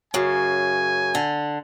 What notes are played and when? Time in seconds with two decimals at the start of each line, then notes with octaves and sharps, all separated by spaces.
0.14 F#2 C#3 G#5
1.15 D3